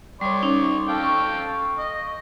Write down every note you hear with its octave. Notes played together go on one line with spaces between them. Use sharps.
G3 C#5 D5 C6 C#6
C#4 D#4 D6
A4 F5 G5
C#6
D#5